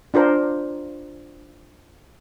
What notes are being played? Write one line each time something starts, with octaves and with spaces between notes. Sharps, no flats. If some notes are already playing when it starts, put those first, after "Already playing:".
D4 F4 A#4 C5